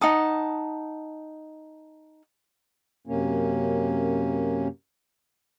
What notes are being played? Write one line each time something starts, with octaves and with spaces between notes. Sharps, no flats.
D#4 F#5 A5 D#6
F#2 C3 A#3 C#4